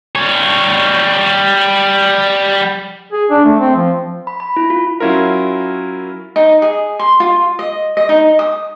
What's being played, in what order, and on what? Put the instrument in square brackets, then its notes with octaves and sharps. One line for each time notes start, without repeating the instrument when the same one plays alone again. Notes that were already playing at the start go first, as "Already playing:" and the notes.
[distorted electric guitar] G3 C#5
[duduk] G#4
D4
A3
C4
F3
[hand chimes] B5
B5
E4
F4
[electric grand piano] F#3 C#4 E4 F4 A#4
[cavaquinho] D#4
G#4
C6
F4
D#5
D#5
D#4
D#6